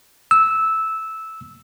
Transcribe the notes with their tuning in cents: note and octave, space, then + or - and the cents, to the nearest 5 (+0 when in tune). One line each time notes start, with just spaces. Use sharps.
E6 -10